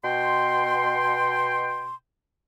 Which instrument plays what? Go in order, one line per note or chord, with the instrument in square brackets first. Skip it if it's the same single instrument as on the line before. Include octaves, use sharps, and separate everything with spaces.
[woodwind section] B2 G5 C6